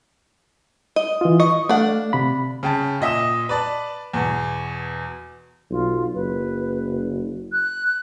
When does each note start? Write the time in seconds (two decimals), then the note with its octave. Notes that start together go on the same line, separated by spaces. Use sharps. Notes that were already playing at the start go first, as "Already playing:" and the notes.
0.96 D#5
1.21 E3 F4
1.40 D#5 C#6
1.69 A3 D4 F5 F#5
2.13 C3 B5
2.63 C#3 G5 A5
3.01 A#2 D#5 E5 D#6 E7
3.49 B4 D5 A5
4.14 E2 B2
5.71 B1 F4
6.14 F#1 B4
7.52 F#6